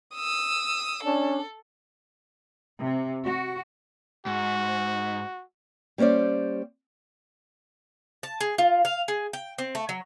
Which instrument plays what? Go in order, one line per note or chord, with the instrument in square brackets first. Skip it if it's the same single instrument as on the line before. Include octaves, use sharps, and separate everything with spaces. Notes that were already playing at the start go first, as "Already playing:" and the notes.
[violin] D#6 E6
[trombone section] C#4 D4 [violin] A4
[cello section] C3
F#4
[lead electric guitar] G#2 [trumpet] F#4
[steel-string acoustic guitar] G3 A#3 C#4 C5 D5
[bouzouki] A5
G#4
F4
F5
G#4
G5
C4
A3
F#3